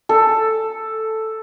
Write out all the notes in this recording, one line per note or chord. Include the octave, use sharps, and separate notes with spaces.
A4